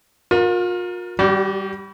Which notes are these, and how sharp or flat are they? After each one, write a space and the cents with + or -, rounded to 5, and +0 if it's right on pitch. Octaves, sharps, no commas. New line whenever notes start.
F4 +40 A#4 +10
G3 +0 F#4 +45 D5 -15